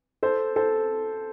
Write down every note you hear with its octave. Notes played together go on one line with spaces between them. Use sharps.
A4 C5
A4 C5